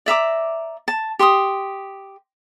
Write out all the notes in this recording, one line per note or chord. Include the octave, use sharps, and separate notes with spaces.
D5 E5 A#5 D6
A5
G4 C6 D6 D#6